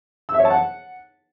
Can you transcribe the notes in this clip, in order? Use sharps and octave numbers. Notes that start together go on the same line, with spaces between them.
E6
E5
C#5
A5
F#5